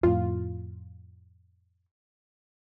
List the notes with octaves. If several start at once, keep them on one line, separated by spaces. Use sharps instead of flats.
F2 A2 F4